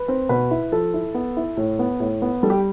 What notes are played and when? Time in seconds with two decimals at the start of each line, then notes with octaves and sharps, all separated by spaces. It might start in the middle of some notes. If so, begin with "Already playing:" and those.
Already playing: B4
0.08 C4
0.29 B2 B4
0.51 E4
0.72 F3 A4
0.94 E4
1.14 B3
1.37 E4
1.57 A2
1.79 B3
2.00 A2
2.22 B3
2.43 G3 A4
2.50 G4